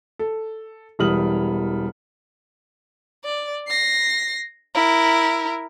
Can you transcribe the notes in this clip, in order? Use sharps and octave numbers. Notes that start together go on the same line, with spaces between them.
A4
E1 E3 G3 D#6 F6 F#7
D5
A#6 C7
E4 A#4